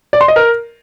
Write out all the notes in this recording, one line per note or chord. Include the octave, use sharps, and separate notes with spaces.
D5
C6
D#5
A#4